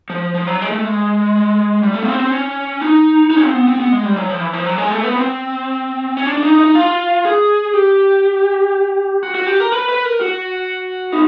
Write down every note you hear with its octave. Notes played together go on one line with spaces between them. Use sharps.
F3
F3
F#3
G#3
A3
G#3
G3
A3
B3
C4
C4
C#4
D#4
D#4
C#4
C4
B3
C4
B3
G#3
G3
F#3
F3
E3
F3
F#3
G#3
A3
B3
C4
C#4
D4
D4
D#4
D#4
F4
G#4
G4
F#4
F#4
G4
A#4
B4
B4
A#4
F#4
D#4